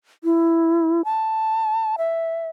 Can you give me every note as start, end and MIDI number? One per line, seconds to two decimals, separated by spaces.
0.24 1.02 64
1.05 1.96 81
1.98 2.48 76